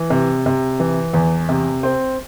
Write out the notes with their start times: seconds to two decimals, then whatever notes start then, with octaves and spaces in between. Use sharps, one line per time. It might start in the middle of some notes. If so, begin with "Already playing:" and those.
Already playing: E3
0.10 C3
0.46 C3
0.80 E3
1.14 E2
1.49 C3
1.83 C4